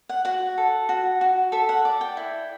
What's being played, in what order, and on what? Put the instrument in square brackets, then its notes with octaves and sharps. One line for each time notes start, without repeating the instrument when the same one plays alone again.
[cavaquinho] F#5
F#4 F#5
A4
F#4
F#4
A4 E5
F#5
D5
G5
E4